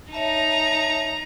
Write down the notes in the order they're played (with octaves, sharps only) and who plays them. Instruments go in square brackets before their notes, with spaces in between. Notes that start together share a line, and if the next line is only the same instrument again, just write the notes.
[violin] D#4 A#5 [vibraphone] C#5 E5 A5